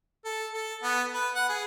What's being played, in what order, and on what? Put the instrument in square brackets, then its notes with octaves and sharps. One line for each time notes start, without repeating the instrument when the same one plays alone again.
[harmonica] A4
A4
B3
B4
F#5
G#4